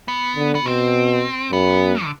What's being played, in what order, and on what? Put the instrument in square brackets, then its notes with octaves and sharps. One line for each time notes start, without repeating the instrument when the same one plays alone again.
[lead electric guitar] B3
[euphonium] D3
[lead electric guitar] B3
[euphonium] B2 [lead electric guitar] C4
[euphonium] F#2 [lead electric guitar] B3
[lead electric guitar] D3